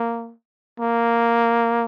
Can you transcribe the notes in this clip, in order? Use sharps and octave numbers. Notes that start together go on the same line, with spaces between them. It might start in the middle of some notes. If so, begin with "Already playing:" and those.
Already playing: A#3
A#3